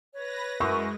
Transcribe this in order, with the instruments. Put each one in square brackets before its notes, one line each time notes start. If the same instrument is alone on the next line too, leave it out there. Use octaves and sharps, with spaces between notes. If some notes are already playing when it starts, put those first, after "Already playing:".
[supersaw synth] B4 A#6 [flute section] C#5
[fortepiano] F#2 [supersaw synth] G#3 [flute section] E4 A#4 B4 [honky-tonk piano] C#6